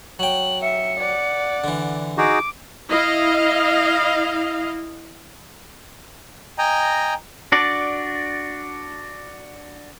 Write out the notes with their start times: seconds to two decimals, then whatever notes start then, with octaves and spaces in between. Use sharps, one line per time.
0.19 F#3 G5 F#7
0.62 E5 C#7
1.00 D5 F#5
1.64 D3 E3
2.18 D#4 F#4 G#4 D6
2.88 E4 D#5 F5
6.58 D#5 G5 G#5 A#5
7.52 D4 F#4 D5